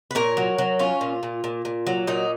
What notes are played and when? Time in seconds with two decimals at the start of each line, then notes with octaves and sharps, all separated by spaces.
0.11 B4
0.15 A#2 A#4 C#5
0.37 F#3
0.58 F#3
0.79 C#4 F4
1.01 A#2
1.23 A#2
1.44 A#2
1.65 A#2
1.87 F#3
2.07 A#2 D#4